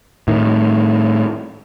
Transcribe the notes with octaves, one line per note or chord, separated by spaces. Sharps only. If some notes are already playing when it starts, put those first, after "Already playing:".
A2 D#3